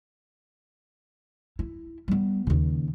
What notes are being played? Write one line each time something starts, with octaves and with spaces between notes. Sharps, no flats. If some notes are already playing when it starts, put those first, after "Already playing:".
E4
G3 B3
D#2 C#3